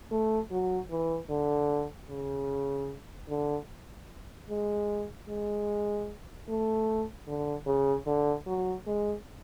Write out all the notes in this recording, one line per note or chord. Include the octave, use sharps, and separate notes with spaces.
A3
F#3
E3
D3
C#3
D3
G#3
G#3
A3
D3
C#3
D3
F#3
G#3